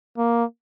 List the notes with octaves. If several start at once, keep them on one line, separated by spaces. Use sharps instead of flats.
A#3